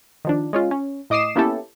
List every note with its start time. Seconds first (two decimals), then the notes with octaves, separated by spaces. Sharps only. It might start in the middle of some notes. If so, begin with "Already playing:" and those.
0.25 D#3 F3 D4
0.53 G#3 C#4 F4
0.71 C#4
1.10 A2 D#5 D6 D#6 C7 E7
1.36 A#3 B3 C#4 E4 G4 A4